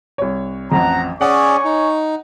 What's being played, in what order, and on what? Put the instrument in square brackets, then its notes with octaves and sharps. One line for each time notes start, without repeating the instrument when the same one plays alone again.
[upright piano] C2 C#5
[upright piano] A1 F2 [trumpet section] F#5 A#5
[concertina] C#4 G#4 D5 [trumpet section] C#5 G#5 C#6 [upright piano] F#5
[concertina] D#4